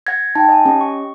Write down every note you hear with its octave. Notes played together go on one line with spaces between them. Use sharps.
F#5 G#6 A#6
D#4 G5 A5
D#5 G#5
C#4 G4 D#5
C#6